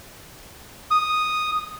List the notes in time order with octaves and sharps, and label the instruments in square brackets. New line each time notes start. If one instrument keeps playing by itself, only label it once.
[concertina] D#6